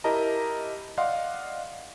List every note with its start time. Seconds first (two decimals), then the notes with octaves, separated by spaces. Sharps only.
0.04 E4 G4 A#4 D#5 A5 A#5
0.97 D5 D#5 F5 F#5 C6